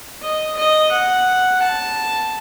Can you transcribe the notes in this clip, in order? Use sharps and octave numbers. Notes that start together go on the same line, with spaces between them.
D#5
D#5
F#5
A5